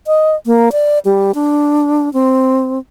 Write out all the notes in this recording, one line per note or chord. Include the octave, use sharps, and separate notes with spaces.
D#5
A#3
D5
G3
D4
C4